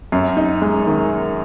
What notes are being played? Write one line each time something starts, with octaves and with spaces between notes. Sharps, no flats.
F#2
D#4
G#3
D#3